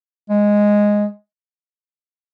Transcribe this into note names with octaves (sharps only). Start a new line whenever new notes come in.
G#3